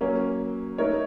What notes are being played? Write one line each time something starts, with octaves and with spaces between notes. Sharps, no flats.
F#3 A#3 C#4
A3 D#4 A#4 C#5